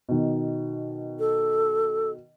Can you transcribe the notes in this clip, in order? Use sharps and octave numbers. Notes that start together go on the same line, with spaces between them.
B2 D#3
A4